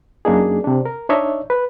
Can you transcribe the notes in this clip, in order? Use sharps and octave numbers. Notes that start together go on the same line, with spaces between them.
F#2 A#3 D4 D#4 G#4
C3 D4
A#4
D4 D#4 C#5 D#5 E5
B4